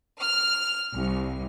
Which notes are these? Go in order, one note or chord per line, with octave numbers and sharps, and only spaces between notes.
F6
C2